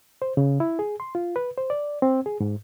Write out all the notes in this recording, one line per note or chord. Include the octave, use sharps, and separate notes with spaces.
C5
C#3
E4
G#4
C6
F4
B4
C5
D5
C4
G#4
G#2